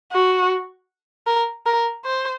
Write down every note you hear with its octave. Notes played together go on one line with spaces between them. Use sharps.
F#4
A#4
A#4
C5